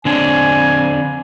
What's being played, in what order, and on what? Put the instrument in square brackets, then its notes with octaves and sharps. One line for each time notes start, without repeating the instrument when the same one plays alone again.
[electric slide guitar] D3 C4 D4 [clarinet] G#5